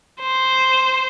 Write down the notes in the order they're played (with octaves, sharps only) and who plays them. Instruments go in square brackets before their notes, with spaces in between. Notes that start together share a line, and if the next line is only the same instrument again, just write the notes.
[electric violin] C5